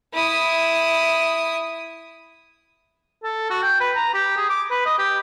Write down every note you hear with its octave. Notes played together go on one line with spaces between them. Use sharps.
E4 D#6
A4
F#4
G5
B4
A#5
G4
G#4
D6
B4
D#5
G4